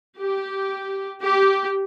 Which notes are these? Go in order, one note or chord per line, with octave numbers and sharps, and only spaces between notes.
G4
G4